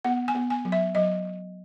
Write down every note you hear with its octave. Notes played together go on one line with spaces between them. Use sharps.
B3 F#5
G#5
B3
G#5
F#3
E5
F#3 D#5